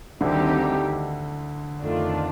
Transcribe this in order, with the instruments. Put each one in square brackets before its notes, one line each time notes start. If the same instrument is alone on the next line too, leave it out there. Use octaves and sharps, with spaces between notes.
[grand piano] D2 D3 [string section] D#3 G3 C4 D#4 G4
[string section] F2 D#3 A3 D4 F4